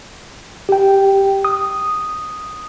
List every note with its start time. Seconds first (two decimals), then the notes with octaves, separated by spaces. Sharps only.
0.69 G4 G5
1.45 D#6